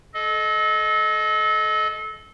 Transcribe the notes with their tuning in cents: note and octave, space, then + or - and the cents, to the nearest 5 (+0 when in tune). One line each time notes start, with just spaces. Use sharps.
A4 -30 D#5 +0